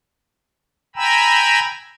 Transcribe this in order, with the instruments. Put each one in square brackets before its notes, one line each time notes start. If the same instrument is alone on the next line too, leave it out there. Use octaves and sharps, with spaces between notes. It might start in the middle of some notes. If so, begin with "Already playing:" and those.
[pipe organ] G5 G#5 A#5 B5 E6